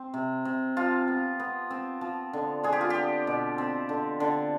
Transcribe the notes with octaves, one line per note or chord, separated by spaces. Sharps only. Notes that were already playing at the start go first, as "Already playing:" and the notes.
Already playing: C4
C3
C3
F3 F4
B3
B3
C4
F3
D3
D4 G#4
G4
F4
B3 G4
B2
C4
D3
D3